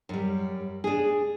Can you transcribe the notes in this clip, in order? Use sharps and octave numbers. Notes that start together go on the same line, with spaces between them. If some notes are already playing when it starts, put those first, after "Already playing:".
F#2 G3
D4 G#4